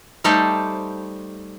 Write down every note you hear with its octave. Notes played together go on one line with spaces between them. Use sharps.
G3 A3 D#4 G4 A4 C5